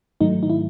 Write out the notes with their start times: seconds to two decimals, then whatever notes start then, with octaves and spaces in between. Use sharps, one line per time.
0.21 G#2 D#3 F#3 A3 D#4
0.43 D#4
0.50 E4